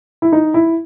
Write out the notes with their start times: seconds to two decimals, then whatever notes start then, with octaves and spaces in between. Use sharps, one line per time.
0.22 E4
0.32 D#4
0.54 E4